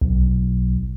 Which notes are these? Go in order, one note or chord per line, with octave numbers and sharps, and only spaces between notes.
B1